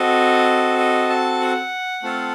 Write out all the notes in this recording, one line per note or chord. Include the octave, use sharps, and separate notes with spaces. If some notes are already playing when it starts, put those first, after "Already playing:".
Already playing: C4 F#4 A4 D#5
D#5
A5
F#5
A3 C4 F4 A4